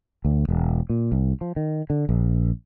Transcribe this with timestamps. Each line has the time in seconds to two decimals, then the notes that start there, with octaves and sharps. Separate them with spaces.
0.25 D2
0.49 E1
0.90 A#2
1.12 C2
1.41 F3
1.56 D#3
1.90 D3
2.09 A#1